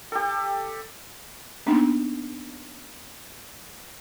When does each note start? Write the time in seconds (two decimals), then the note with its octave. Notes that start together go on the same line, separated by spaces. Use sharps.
0.12 G4 A4
1.66 A#3 B3 D4 D#4